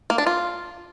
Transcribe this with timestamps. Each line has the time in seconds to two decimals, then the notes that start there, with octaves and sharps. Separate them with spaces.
0.10 A#3
0.18 D4
0.27 F4